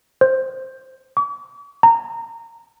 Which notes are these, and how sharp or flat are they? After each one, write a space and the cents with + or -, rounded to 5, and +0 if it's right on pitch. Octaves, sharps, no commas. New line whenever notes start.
C5 +5
D6 -45
A#5 -20